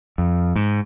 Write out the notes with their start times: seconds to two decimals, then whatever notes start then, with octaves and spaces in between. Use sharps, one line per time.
0.18 F2
0.56 G#2